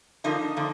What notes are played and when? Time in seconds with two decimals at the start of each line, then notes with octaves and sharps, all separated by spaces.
0.24 D3 F3 A#3 D#4
0.56 D3 F3 A#3